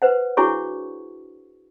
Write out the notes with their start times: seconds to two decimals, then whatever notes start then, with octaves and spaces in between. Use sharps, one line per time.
0.02 B4 C5 F#5
0.37 D4 E4 F#4 G#4 C#5 C#6